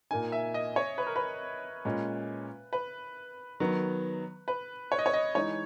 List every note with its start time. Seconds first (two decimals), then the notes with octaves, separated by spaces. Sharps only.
0.11 A#2 A#3 D#4 G#5
0.32 E5
0.54 D#5
0.76 C#5
0.98 B4
1.07 A#4
1.16 B4
1.85 A#2 G#3 C#4
2.73 B4
3.60 D#3 F#3 B3
4.48 B4
4.92 C#5
4.99 D#5
5.06 C#5
5.13 D#5
5.35 E3 G#3 D#4 C#5